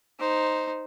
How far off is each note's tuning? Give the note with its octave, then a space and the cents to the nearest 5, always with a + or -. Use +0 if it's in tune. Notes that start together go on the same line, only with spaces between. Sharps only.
D#4 +0 C5 +0